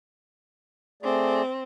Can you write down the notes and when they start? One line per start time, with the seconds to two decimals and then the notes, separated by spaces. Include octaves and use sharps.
1.03 A3 C4 G#4 D5